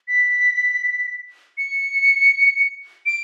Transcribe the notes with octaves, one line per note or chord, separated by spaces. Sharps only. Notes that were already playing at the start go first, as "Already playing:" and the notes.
B6
C#7
D7